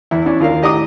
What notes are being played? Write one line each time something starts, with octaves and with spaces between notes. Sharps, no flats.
E2 E4
C#4 D4 E4
D#2 F4 A#4 F5
A2 G4 D#5 A#5 D6 D#6